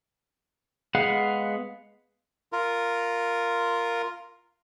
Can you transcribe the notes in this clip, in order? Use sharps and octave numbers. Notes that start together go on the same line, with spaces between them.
G#3 B3 G#4 F5 F#5
F4 A#4